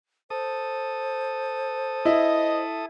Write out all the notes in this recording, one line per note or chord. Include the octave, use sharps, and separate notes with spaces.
A4 C5 D#6
E4 D#5